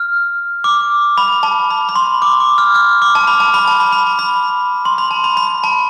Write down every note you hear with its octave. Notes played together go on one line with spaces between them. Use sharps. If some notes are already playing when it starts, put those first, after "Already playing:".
Already playing: F6
D6
B5
A5
B5
B5
C6
D6
D6
F6
F6
D6
A5
B5
A5
B5
A5
B5
B5
A5
B5
C6
B5
A5
B5
B5
A5